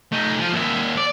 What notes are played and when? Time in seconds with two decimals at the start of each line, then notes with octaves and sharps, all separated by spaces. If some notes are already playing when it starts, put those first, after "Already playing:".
0.12 A3 D#4
0.39 F3
0.52 D#2 E5
0.97 D5